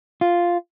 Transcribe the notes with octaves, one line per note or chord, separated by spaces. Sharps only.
F4